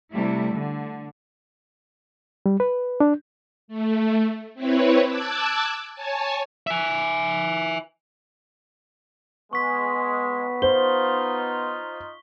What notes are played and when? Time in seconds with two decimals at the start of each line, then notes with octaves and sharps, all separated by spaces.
0.13 C3 G3 A3 E4
0.53 D3
2.46 G3
2.60 B4
3.00 D4
3.68 A3
4.54 C4 E4 B4 C#5
5.07 A5 D6 E6 F#6 G#6
5.92 C#5 G#5 A5
6.67 E5 G#5
9.53 G#3 B3 C#6 B6
10.62 D#4 F4 C5 G7